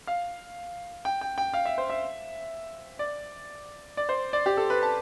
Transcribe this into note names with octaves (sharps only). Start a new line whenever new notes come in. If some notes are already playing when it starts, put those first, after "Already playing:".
F5
G5
G5
G5
F5
E5
C5
E5
D5
D5
C5
D5
G4
A4
B4
A5